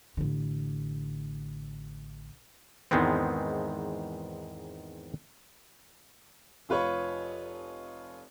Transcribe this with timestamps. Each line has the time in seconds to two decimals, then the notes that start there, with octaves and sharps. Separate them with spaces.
0.17 A1 D3
2.91 E2 G#2 D#3 G#3 B3 C4
6.69 F1 F4 B4 C#5 C#6